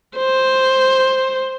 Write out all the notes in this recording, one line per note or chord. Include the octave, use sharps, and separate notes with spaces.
C5